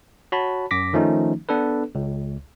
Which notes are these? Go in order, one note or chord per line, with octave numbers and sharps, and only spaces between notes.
F#4 C#5 A5 B5
F#2 D6 A#6 B6
D#3 F3 A3 C#4 D#4
B3 D4 A4 B4
C#2